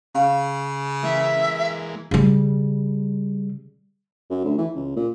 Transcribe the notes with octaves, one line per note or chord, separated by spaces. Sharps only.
C#3 F5
E3 G#3 A#3 E5
C#3 G3
F#2
D2
E3
C#2
A#2